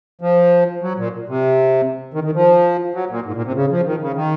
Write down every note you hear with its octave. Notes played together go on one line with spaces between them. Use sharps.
F3
F#3
A#2
C3
D#3
D#3
F3
F#3
A#2
G#2
A#2
C3
C#3
F3
D#3
C#3
D#3